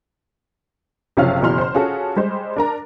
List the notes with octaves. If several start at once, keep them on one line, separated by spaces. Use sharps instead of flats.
F#1 C3 F3 C#4 F5 F6
F#1 B2 E3 C6 F6
C5 C6
C#4 F4 F#4 G#4 A4
G3 G#3 C5
D4 A#4 A#5